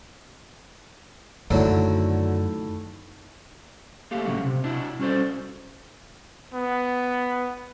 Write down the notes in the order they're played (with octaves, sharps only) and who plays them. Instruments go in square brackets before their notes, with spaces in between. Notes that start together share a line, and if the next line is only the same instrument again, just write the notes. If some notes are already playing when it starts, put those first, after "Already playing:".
[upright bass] F#2 [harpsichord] D3 F#3 [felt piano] D#3 A3 E4
[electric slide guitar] A3 A#3 G4 F5
F#2 A2 C#3 F#3 A3 F#4
C3
D4 E4 F#4
G3 C#4 F#4 A4 C5 D5
[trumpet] B3